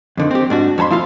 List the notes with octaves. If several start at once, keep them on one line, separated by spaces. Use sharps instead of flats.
F2 D3 D#3
C4 G4
G#2 D4 F#4
F2 C#5 A5 B5 C6
F3 E4 F4 F5